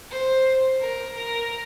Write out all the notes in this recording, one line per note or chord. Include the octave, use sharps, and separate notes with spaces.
C5
A#4
A#4